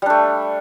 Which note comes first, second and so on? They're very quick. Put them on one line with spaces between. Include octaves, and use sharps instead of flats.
G3 D4 A3